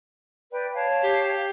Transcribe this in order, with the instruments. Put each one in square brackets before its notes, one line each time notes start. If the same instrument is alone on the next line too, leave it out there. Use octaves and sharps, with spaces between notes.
[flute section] B4 D5 G5
C#5 F5 A5
[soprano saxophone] G4